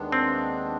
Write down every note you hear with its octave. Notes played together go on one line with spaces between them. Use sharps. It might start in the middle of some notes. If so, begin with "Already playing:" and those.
Already playing: D#2 D#3 G#3 B3 D4
C4